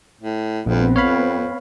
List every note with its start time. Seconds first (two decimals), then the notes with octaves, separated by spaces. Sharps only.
0.21 A2
0.66 A#1 F2 B3 C4
0.96 F2 C#5 F5 B5